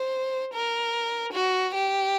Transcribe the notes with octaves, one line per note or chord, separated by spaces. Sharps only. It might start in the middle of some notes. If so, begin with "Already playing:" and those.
Already playing: C5
A#4
F#4
G4